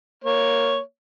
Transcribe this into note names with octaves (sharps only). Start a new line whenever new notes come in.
A#3 C#5